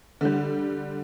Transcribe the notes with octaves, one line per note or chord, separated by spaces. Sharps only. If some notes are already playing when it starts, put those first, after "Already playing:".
D3 G3